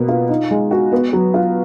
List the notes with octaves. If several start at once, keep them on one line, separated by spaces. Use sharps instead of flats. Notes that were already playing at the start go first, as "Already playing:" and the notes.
Already playing: B2 A#3 B3
F4
D#4
G#3
F#4
B3
F#3
F4